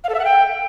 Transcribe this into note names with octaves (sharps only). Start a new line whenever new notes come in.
F5
A4
E5
F#5
G5